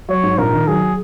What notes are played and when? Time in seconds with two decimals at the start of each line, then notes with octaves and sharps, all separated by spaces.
0.09 F#3 C#5
0.23 G#2
0.38 A#1 A#4
0.53 D#3
0.68 F#3 G#4